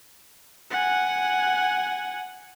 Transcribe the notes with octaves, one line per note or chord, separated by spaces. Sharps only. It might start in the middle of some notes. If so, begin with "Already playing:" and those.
F#5 G#5